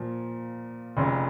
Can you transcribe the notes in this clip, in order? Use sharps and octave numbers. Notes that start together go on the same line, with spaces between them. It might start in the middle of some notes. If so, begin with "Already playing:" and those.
Already playing: A#2 F3
F1 F2 C#3